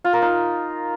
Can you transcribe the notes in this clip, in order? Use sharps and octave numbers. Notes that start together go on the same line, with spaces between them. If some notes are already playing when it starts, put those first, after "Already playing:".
F4
A#4
D#4